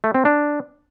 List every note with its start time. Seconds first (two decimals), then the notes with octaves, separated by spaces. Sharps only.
0.04 A3
0.14 C4
0.25 D4